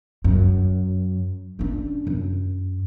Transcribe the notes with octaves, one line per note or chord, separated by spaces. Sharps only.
F#2
C#4 D4
F#2